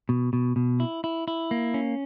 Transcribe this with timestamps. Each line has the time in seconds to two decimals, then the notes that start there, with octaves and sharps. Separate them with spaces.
0.09 B2
0.33 B2
0.56 B2
0.80 E4
1.04 E4
1.28 E4
1.51 A#3
1.74 C#4